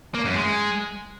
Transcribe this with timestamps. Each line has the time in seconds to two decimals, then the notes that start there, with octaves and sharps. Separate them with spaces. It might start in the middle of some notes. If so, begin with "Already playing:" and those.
0.14 A#3
0.25 F#2
0.35 G#3